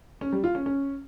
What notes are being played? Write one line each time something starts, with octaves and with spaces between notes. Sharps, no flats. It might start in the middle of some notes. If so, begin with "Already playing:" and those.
C#4
G3
F4
C#4
C#4